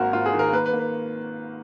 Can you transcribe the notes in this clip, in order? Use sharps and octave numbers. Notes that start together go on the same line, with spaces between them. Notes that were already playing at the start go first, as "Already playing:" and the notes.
Already playing: G#1 G#2 A#3 F#4 A#4
G#1 F4
G#4
D#3
A#4
A#3 B4
B4
A#3
B4